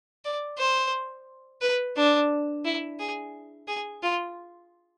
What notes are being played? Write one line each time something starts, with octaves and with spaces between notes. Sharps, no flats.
D5
C5
B4
D4
E4
G#4
G#4
F4